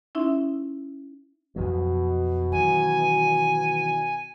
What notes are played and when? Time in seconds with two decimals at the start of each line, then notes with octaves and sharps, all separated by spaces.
0.15 C#4 D#4 E4 E5 C6
1.56 F2 B2 F3 F#3
2.52 D#3 E3 F#3 G#5